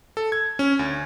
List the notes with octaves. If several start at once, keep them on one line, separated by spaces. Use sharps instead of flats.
A4
G#6
C#4
D2